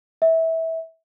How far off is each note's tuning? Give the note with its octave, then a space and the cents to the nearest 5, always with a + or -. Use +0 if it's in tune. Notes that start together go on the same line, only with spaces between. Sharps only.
E5 -20